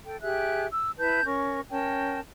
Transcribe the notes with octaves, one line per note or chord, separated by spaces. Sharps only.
A4 G5
G4 G#4 E5 F#6
E6
E4 B4 A5 G6
C#4 A#4 C#6
C#4 A#4 G5 A5